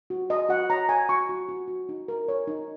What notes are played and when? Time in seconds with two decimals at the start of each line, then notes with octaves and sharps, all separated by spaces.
0.10 F#4
0.29 F#4 D#5
0.49 F#4 F#5
0.70 C#5 A#5
0.89 C#5 G#5
1.09 F#4 C#6
1.29 F#4
1.49 F#4
1.68 F#4
1.89 D#4
2.08 A#4
2.28 C#5
2.47 D#4